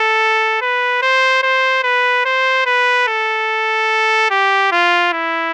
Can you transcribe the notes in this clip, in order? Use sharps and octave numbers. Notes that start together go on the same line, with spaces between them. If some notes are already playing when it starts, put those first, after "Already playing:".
Already playing: A4
B4
C5
C5
B4
C5
B4
A4
G4
F4
E4